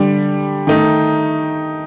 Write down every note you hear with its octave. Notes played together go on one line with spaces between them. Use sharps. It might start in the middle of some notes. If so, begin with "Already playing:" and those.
Already playing: D3 G3 D4 G4
D#3 A3 D#4